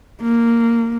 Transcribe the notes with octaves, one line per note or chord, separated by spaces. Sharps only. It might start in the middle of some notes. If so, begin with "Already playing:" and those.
A#3